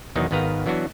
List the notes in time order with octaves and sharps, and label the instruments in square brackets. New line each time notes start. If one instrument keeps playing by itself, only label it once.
[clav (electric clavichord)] E2 B2 D#3 F#3 D#4
G#1 D#3 B3 B4 F5 A#5
E3 F#3 B3 D4 F#4